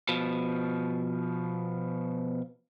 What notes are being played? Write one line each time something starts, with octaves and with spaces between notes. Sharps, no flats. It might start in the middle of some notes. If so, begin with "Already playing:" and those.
B2 F3